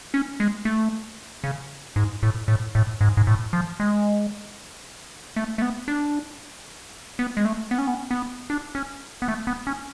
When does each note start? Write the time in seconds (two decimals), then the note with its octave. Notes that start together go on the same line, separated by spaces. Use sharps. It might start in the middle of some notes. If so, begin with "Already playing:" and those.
0.14 C#4
0.40 G#3
0.65 A3
1.44 C#3
1.96 G#2
2.23 A2
2.48 A2
2.75 A2
3.01 G#2
3.17 G#2
3.27 A2
3.53 F3
3.80 G#3
5.36 A3
5.58 A3
5.62 B3
5.88 D4
7.19 B3
7.37 G#3
7.45 A3
7.71 B3
7.78 C#4
7.87 B3
8.11 B3
8.50 D4
8.75 C#4
9.22 B3
9.28 A3
9.47 B3
9.67 C#4